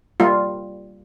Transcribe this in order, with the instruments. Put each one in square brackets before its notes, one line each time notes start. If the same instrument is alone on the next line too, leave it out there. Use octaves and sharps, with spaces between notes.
[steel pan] G3 A#3 F4